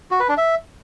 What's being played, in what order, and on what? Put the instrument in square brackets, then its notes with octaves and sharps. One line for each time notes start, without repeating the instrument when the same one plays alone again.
[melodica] F#4
B4
D4
E5